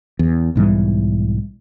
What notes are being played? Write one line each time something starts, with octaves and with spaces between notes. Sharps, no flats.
E2
B1 G#2 E3 G3